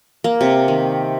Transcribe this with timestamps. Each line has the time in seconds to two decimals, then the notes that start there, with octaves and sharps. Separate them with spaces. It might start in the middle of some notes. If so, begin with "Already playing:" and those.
0.24 A#3
0.41 C3
0.68 D#3